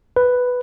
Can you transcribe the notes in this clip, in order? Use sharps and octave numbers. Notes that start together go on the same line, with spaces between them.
B4